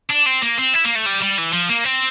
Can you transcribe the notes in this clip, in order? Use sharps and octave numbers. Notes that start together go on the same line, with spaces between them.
D4
C4
A#3
C4
E4
A#3
A3
G3
G3
E3
F3
A#3
C4